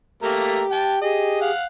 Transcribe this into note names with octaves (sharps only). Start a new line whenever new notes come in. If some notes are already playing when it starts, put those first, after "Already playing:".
A3 A#3 G4 A#4
G5 A5
G4 G#4 D#5
F5 F#5